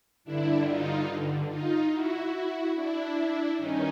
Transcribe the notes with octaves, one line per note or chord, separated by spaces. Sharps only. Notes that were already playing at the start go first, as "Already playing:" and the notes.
G2 D3 D4 E4
D#4 F4
D#4 F4
E4 F#4
D4 E4
G2 D#3 C#4 D#4